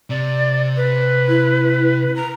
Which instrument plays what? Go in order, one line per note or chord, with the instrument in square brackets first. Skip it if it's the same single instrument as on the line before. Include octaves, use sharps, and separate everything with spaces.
[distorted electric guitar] C3 [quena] D5
[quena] B4
[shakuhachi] E4
[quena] A#5